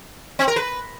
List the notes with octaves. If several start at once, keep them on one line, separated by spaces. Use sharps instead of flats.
C4
A#4
B4